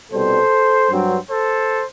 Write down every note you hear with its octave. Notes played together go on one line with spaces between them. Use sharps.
C2 B2 G3 A4 C5
G2 F#3 C4
A4 C5